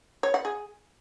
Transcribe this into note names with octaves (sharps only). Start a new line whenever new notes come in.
C#5
F#5
G#4